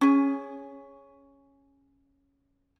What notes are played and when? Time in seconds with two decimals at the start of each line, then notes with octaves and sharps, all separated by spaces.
0.01 C#4 G#4